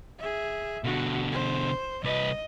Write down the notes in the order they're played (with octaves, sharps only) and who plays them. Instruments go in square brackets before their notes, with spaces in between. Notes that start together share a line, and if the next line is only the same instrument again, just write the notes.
[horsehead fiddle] G#4 E5
[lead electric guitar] B2 D3 [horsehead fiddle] F#4
[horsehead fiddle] C5
[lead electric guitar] C2 B4 [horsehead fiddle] D#5